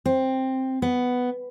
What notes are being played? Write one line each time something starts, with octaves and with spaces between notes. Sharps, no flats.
C4
B3